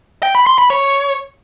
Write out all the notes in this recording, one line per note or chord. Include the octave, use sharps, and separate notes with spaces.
G5
B5
C6
B5
C#5